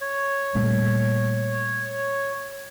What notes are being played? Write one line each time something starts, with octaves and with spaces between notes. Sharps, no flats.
C#5
A#2 G3 A3